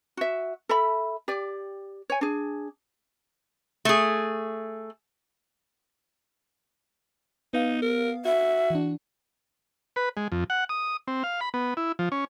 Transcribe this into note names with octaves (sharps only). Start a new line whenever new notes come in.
F#4 E5
A4 E5 B5
G4 D5
C#5 G#5
D4 G#4
A3 G#4
B3 D#4 F5
A#4
F#4 E5
E3 D4
B4
G#3
F2
F#5
D#6
C4
F5
B5
B3
E4
F3
C#4